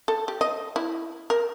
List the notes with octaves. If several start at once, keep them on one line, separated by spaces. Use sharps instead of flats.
A4
G4
D#5
E4
A#4